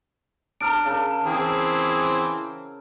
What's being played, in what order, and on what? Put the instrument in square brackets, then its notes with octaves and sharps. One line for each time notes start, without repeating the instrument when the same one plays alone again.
[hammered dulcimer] D4 A4 [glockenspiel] A#5 F6 D7
[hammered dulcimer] C#3 A4 A#4
[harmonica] E3 C4 G#4